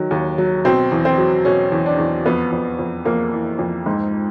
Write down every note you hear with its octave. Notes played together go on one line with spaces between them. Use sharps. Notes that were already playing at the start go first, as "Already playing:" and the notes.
Already playing: D#3 F#3
D#2
F#3
B2 C4
E2
C4
F#3
B2 C#4
E2
D4
E2
F2 B3
F2
F2
F2 A#3
E3
F2
G#2